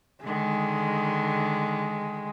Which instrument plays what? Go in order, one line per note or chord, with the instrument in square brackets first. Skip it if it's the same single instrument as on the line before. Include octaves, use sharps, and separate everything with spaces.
[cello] D3 D#3 [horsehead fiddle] G#3